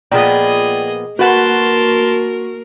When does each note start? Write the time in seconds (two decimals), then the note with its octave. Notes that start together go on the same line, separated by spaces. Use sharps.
0.12 A#2 F3 B3 G#4 D5 D#5 G5
1.19 A#3 F#4 A#4 B4 F#5 A5 C6